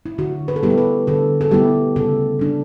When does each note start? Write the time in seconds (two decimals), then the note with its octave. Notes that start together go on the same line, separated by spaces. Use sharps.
0.06 E4
0.18 D3 F#4
0.48 B4
0.56 A4
0.63 G3 B3 E4 G4
0.70 A4
0.78 B4
1.07 D3 A4
1.41 A4
1.51 G3 B3 E4 G4
1.96 C#3 A4
2.39 G3 D4